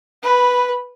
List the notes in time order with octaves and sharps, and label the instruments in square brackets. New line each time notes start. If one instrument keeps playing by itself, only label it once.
[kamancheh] B4 B5